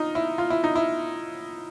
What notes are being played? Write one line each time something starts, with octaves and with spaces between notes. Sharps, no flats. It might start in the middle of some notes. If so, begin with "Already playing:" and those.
Already playing: D#4 F4
E4
F4
E4
D#4
E4